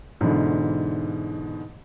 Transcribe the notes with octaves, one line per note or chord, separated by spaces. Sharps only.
G#2 B2 D3 E3